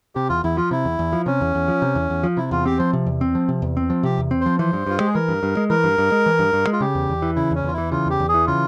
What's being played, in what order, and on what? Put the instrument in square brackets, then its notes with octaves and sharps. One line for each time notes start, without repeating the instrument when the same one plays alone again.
[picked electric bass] C3 [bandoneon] G4
[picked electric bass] E2 [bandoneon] F4
[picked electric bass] E2 [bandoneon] E4
[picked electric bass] F3 [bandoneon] F4
[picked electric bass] C3 [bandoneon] E4
[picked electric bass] E2
E2
F3
[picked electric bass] C3 [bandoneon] C#4
[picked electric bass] E2
E2
F3
C3
E2
E2
F3
[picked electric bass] C3 [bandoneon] E4
[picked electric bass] E2 [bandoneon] F4
[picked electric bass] C4 [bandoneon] G4
[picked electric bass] F3 [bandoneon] C5
[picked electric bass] C3
E2
C4
F3
C3
E2
C4
F3
[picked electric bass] C3 [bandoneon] G4
[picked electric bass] E2
C4
[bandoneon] C5
[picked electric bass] F3
[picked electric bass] E3 [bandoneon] C5
[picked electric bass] G2
[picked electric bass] G2 [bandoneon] F4
[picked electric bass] G#3 [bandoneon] G4
[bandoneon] G#4
[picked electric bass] E3 [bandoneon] A#4
[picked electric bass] G2
G2
G#3
[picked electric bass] E3 [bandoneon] A#4
[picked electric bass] G2
G2
G#3
E3
G2
G2
G#3
[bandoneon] F4
[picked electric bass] C#3 [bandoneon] G4
[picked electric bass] E2
E2
E3
[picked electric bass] C#3 [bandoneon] E4
[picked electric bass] E2
[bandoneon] C#4
[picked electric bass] E2 [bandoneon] F4
[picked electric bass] E3 [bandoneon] E4
[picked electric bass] C#3 [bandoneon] F4
[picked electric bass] E2 [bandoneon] G4
[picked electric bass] E2
[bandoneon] G#4
[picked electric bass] E3
[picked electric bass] C#3 [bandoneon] F4